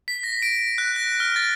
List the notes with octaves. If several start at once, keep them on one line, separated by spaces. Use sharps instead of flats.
B6
A#6
D7
F#6
A#6
F6
A6